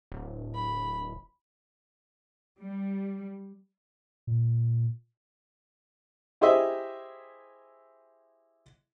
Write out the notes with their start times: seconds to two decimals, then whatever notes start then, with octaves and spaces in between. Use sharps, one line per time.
0.12 D1
0.54 B5
2.59 G3
4.27 A#2
6.41 E4 G4 G#4 C5 D#5 E5